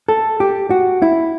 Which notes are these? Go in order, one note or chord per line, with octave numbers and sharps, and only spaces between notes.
A4
G4
F#4
E4